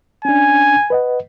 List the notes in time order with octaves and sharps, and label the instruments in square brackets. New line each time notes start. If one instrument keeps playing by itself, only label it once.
[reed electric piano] C#4 D4 [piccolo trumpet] G#5
[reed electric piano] B4 D#5 F#5